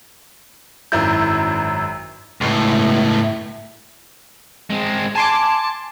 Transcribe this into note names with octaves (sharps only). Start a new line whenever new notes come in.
G#1 F#2 E4 G6
C#2 A2
G#3 C4
G#5 A5 C6 D6